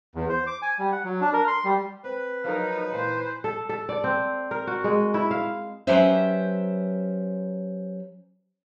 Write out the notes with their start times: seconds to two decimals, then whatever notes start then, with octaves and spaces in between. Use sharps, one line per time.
0.15 E2
0.29 C5
0.47 D6
0.62 G#5
0.79 G3
0.92 F#5
1.04 F#3
1.21 D4
1.33 A#4
1.48 C6
1.65 G3
2.04 C4 B4
2.44 F3 F#3 D#4 A4 A#4
2.92 A#2 E3 C5
3.44 A4
3.69 A4
3.89 D5
4.04 C4
4.51 A#4
4.67 F#4
4.84 G#3
5.14 E4
5.31 F5
5.87 F#3 C#4 G4 B4 C5 E5